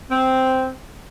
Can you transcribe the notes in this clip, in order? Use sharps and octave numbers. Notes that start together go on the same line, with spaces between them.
C4